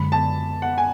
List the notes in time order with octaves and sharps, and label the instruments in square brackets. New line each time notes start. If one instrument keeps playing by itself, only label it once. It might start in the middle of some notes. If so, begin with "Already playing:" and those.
Already playing: [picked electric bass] F#2 D3 G#3 [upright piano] B5
[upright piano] A5
F#5
G#5